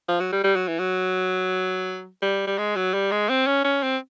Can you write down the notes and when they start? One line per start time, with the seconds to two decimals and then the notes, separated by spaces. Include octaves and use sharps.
0.09 F3
0.20 F#3
0.32 G3
0.44 G3
0.56 F#3
0.68 E3
0.79 F#3
2.22 G3
2.47 G3
2.58 G#3
2.76 F#3
2.94 G3
3.11 G#3
3.29 C4
3.47 C#4
3.64 C#4
3.83 C4